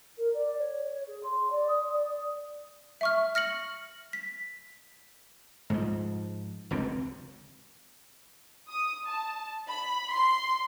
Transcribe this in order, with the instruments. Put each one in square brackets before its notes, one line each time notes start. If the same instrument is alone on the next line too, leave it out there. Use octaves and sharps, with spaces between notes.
[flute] A#4
D5
C#5
C#5
G#4
C6
D5
D#6
D5
[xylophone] E5 C#6 F6
F6 A#6 C#7 F#7
B6
[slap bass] G#2 F3
F1 C#2 D3 C4
[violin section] D#6
A5
B5
C6